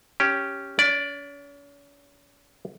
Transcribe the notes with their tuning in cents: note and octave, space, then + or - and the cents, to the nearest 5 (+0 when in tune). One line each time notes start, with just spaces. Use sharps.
C#4 +0 G4 +0
C#4 +40 D5 +0